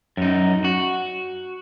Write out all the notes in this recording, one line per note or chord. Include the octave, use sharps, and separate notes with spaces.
F#2 D#4
F#4